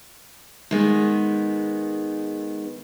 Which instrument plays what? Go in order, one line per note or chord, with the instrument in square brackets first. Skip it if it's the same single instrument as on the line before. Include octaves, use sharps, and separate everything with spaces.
[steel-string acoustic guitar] D#3 G#3 B3